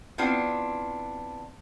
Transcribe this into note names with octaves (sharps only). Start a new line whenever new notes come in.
B3 C4 D4 E4 F4